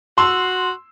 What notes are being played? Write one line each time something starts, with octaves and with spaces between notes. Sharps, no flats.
F#4 C6 E6